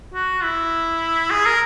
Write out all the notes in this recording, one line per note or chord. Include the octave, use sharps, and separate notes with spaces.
F#4
E4
G#4
A#4